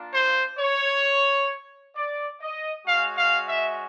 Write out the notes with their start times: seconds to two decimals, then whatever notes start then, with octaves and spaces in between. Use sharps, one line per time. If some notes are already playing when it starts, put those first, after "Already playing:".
Already playing: A#3 D4 F4
0.11 C5
0.58 C#5
1.95 D5
2.41 D#5
2.86 G#3 C#4 F#4 F5
3.17 F5
3.47 E5